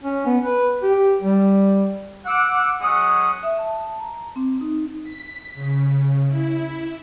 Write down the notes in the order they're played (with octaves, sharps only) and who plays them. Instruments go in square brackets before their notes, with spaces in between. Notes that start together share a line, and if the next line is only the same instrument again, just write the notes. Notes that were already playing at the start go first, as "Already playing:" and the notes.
[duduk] C#4
B3
B4
G4
G3
[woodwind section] F#5 D6 E6
F#3 G#3 C#4 F#5 D#6
[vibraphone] E5
A5
A#5
C4
D#4
[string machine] B6
C#3
E4